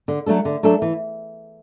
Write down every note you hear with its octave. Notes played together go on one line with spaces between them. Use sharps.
D3
F#3 A3 D4 A4
D3
F#3 A3 D4 A4
E3